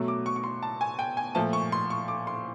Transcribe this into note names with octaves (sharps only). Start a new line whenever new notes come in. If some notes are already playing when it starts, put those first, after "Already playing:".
Already playing: B2 F#3 A3
D6
C#6
C#6
C6
A5
G#5
G5
G#5
A#2 F3 A3 A5
C#6
C6
C#6
D6
C6